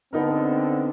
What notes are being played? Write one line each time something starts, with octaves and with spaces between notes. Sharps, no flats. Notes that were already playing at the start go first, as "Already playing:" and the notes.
D3 B3 C4 D#4 A#4